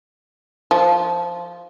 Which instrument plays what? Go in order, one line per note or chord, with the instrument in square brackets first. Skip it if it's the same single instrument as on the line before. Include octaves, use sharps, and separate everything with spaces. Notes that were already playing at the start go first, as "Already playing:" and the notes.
[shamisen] F3